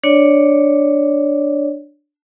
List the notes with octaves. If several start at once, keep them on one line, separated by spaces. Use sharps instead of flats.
D4 C#5 D5